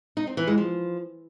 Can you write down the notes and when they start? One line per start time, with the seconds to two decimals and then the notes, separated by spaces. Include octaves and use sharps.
0.17 D#4
0.27 C4
0.37 E3
0.47 G#3
0.58 F3